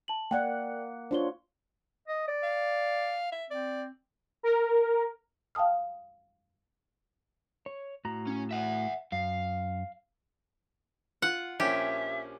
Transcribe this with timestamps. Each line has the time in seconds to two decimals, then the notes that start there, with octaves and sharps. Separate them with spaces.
0.08 A5 F#7
0.31 A#3 D5 F#5 G5
1.11 D4 F4 C5 C#5 G7
2.08 D#5
2.28 D5
2.43 F5
3.32 E5
3.51 C4 D5
4.43 A#4
5.55 F5 G5 A5 D#6 F6
7.66 C#5
8.05 A2 F#4 A#5
8.27 C#4
8.51 E5 F#5
9.12 F#2 F5
11.22 F4 F#5
11.60 A#1 F3 C#4 G4 E5